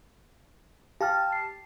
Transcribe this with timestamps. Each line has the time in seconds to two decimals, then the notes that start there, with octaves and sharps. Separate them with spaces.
1.01 G4 F5 G5 A5 F6
1.32 C7